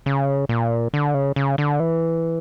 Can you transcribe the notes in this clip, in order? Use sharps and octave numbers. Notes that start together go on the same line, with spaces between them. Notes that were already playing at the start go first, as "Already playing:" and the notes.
C#3
A#2
D3
C#3
C#3
D3
E3